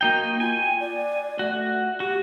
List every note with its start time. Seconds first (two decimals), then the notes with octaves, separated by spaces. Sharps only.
0.01 A#3 D#4 F#4 G5
0.40 F4 G#5
0.61 G5
0.80 D5
1.39 A3 F#4
2.00 F#4 G4